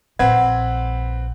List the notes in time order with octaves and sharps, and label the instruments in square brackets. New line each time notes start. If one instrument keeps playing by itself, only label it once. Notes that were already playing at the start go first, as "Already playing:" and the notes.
[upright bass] A#1 [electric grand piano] C4 B4 G#6 [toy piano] F#5